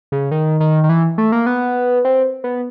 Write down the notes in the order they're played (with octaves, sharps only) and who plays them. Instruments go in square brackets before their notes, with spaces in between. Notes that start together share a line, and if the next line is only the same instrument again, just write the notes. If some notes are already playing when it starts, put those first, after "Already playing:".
[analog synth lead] C#3
D#3
D#3
D#3
E3
A3
A#3
B3
C4
B3